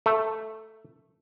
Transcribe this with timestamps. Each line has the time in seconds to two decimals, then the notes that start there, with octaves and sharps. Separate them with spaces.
0.06 A3